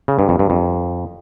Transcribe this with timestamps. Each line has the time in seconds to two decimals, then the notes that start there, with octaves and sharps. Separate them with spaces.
0.08 C#3
0.19 G2
0.29 F2
0.39 G2
0.50 F2